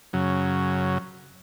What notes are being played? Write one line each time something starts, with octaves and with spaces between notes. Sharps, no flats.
F#2 C#3 F#3